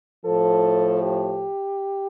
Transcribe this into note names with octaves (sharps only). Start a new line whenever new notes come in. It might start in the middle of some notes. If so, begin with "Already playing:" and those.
A2 F3 A4
G4